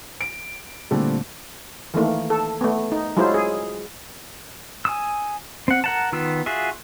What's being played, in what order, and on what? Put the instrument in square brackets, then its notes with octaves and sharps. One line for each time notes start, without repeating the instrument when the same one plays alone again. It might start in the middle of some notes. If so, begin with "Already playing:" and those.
[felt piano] D7
A#2 D3 G3 A3 C4
[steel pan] D#3 E3 A3 A#3
A4
A3 B3
D#4
F#3 G#3 E4 F4 C5
G#4
[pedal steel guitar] G#5 D#6 E6
C4 F#5
A#4 F#5 A5
D#3 B3 F4 E6
F4 F#4 G#4 E5